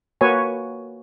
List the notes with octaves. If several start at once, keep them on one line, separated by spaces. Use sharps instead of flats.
A#3 F#4 B4 C#5 G#5